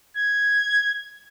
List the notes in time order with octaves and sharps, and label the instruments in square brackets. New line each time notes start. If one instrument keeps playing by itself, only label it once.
[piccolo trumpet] G#6